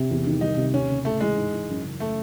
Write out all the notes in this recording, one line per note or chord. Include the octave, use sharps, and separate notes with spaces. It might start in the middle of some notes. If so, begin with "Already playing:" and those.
Already playing: C3
E2
D#3
C2 D#4
C3
D#2 C#4
C#3
A2 A3
E3 G#3
G#2
E3
F#2
C#3
A3